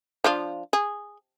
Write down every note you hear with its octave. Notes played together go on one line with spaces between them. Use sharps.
F3 D4 F4
G#4